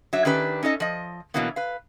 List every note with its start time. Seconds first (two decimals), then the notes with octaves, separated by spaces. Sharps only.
0.13 F#3 D4 E5
0.25 D#3 C#4 D4 G4 B4
0.63 C#4 D#4 A4 D#5
0.80 F3 D#5
1.34 B2 D#3 E3 F#3 A#3 B3
1.56 B4 F5